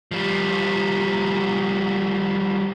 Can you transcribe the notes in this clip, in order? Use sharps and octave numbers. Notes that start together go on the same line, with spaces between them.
F3 G3